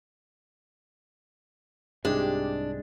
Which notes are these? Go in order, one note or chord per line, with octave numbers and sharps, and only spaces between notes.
C2 G#2 C3 G#3 D4 G4